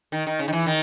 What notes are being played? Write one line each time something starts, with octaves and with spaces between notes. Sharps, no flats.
D#3
D#3
C#3
D#3
E3
D#3